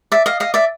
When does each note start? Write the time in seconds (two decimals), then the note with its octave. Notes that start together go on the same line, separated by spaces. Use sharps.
0.12 D5 E5
0.26 D#5 F5
0.40 D#5 F5
0.54 D5 E5